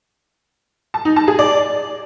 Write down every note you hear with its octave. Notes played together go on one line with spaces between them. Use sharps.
A5
D#4
A5
G#4
D5